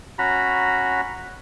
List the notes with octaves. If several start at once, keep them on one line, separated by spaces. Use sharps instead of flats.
C#4 F#4 A#5 B5